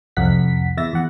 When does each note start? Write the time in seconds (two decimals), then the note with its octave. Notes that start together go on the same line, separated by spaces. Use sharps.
0.17 C2 F2 F#5 B6
0.77 E2 E5 A6 A#6
0.93 E2 F#5